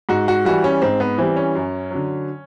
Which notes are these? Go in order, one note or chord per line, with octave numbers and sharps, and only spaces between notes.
G#2 F#4
F#4
E3 G3 F#4
C#4
G#2 C4
B3
E3 G3 C4
C#4
F#2
D3 F#3